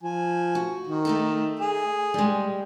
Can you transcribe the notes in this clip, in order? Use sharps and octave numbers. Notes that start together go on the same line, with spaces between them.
F3 G#5
F#4
D#3
A3 D#4 A4
G#4
G3 G#3